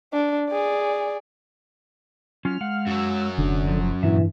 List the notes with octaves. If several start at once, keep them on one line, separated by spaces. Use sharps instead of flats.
D4
G#4 D5
F#3 C#4 F4 F6
G#3 F5 F#5
F#2 F#3 E6
F1 D3
F3
G2 A#2 E3 E5